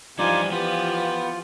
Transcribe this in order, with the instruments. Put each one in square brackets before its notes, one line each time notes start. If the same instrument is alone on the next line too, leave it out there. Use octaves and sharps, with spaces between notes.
[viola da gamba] E3 F3 [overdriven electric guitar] G3 D4 [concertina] D#4 F4 D6 [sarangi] G#5
[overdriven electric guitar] B3 [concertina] F4 [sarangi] G4